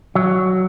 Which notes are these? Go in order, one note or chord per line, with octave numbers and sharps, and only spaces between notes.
F#3